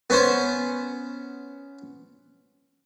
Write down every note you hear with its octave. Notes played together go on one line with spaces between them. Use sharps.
B3 C#4 C5